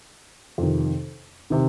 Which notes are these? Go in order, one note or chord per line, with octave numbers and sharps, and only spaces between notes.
F2 C3 D#3
C3 D#3